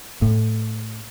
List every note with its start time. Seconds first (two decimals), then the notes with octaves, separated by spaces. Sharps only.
0.22 A2